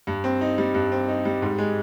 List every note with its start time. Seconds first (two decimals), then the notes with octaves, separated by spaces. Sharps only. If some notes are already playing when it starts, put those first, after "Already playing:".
0.07 G2
0.24 C4
0.41 D#4
0.58 G3
0.74 G2
0.92 C4
1.08 D#4
1.25 G3
1.42 G#2
1.58 G#3